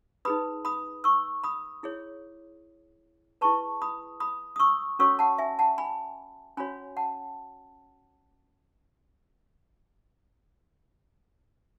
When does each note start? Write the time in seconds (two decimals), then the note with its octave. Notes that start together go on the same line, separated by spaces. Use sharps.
0.25 D#4 G#4 B4 B5 D#6
0.65 B5 D#6
1.04 C#6 E6
1.44 B5 D#6
1.83 E4 G#4 C#5
3.41 E4 G#4 B4 A5 C#6
3.82 B5 D#6
4.20 B5 D#6
4.56 D#6
4.59 C#6 E6
4.99 C#4 F#4 A4 C#5 C#6 E6
5.19 F#5 A5
5.38 E5 G#5
5.59 F#5 A5
5.78 G#5 B5
6.57 C#4 F#4 C#5 G#5 B5
6.97 F#5 A5